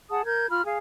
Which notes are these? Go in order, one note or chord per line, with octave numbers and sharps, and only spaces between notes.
G#4 F#5 A5 D#6
A#4 G6 G#6
F4 B5 F6
G#4 F5 G#5